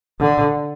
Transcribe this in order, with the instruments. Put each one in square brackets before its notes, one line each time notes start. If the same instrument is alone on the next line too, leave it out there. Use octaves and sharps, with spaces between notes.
[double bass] D3